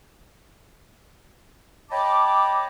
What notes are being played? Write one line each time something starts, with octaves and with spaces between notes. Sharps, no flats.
C#5 D#5 G5 A5 B5 D6